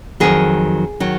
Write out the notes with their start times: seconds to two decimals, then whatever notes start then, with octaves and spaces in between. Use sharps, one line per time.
0.20 F2 D#3 F#3 G#4
1.00 D#3 F#3